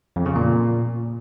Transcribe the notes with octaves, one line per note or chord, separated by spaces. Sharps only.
F2
C#3
A#2